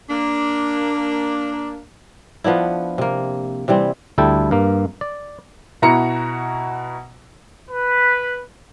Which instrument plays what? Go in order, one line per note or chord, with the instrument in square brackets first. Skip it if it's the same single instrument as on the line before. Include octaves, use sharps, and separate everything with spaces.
[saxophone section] A#3 D4
[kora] F3 B3 D4 E4
C3 A#3
C3 E3 G3 C4
[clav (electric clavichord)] D2 G3 E4 A4 G5
G2 A#3
D5
[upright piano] B2 E4 F#4 A#5 C#7
[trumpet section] B4